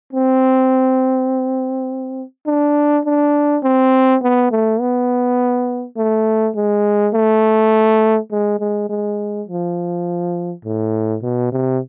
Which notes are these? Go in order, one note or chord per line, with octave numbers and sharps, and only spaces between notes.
C4
D4
D4
C4
B3
A3
B3
A3
G#3
A3
G#3
G#3
G#3
F3
A2
B2
C3